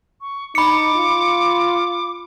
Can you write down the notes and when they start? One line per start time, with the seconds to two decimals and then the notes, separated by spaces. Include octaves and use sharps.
0.21 C#6
0.55 D#4 B5 D6 C#7
0.96 F4